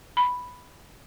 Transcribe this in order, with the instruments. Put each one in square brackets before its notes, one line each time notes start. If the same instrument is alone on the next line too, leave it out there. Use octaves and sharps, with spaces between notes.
[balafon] B5